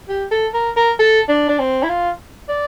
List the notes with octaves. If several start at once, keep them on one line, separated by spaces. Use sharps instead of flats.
G4
A4
A#4
A#4
A4
D4
D4
C4
E4
F4
D5